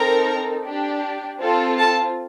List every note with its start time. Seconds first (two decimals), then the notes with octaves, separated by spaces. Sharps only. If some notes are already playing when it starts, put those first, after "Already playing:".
Already playing: C4 D#4 A4 A#4 A#5
0.64 D4 G4
1.40 C4 F4 A4
1.78 A4 A5